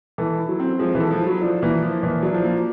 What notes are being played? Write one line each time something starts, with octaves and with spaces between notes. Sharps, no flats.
E3 A4
E4
F#3
C4
F3 G#3
E3
A4
F3
E4
F#3
F3 D4
E3 A#3
F3
A#2 E3
F#3 D4
F3
A#3